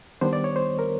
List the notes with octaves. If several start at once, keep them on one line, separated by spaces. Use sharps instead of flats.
D#3 G3 B3 D4 C5
D5
C#5
C5
A#4